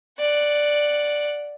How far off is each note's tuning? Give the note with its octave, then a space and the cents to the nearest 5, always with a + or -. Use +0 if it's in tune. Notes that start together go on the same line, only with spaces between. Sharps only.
D5 +0 F#5 +0